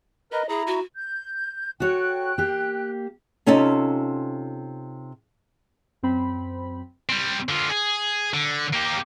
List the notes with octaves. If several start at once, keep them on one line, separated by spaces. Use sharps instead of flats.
A#4 B4 D#5
E4 G#4 A#5
F#4
G6
F#4 A4 C#5 G5 F#6
A#3 G4
C3 C#4 D#4 F4 A4
F#2 C4 B5
G3 C4
D3 F4
G#4
D3
A#3 G4